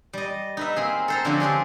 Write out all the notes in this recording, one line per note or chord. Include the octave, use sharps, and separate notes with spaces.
G3 D#5
D#4 B4 E5
A#3 C4 G#4
A4 C5 A#5
D3 F3 C4 C#4 F#4 G4
F3 C4 G4 G#4